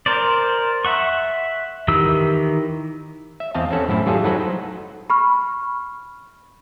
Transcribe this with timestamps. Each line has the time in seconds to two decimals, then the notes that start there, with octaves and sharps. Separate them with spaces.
0.06 A#4 C5 D5
0.85 E5 F#5 C#6
1.88 D#3 E3 G4 E6
3.40 E5
3.55 E2 C4 D#5 F5 A5
3.70 C4 C#4 A4 F#5
3.89 F#2 A2 E4 A4
4.06 E3 G3 F4 G#4 A4
4.24 F#3 D#4 F#4 A4 B4 C5
5.10 B5 C#6 F6